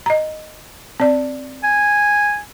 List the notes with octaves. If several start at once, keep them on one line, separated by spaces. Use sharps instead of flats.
D#5 A#5
C4 D5
G#5